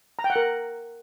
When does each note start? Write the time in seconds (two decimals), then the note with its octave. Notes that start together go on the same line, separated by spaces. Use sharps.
0.19 A#5
0.24 G5
0.30 F#5
0.36 A#4